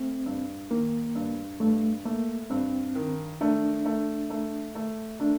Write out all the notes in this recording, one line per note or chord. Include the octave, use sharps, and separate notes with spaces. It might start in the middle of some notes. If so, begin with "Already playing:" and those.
Already playing: A3 C4
G2
D#3 A#3
G2
G2 A3
A3 A#3
G2 C4
D#3
A3 D4
A3
A3
A3
A3 D4